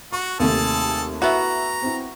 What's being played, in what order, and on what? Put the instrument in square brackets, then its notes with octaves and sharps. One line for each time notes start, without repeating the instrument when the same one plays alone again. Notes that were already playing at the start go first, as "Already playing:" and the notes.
[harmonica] F#4 [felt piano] C#6
[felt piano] D#2 C3 A3 [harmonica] G#4 A4 A5
[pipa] A3 B3 F#4 [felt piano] E4 E5 [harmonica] A#5
[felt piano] C4 E4